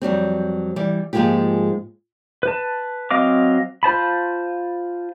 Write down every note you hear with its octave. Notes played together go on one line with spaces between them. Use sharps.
F2 F#3 G3 C4
E3 G3 D5
G#2 F3 G#3 A#3 F4 G4
B4 A5
F#3 C4 D#5 F5 D6
F4 C5 A5 B5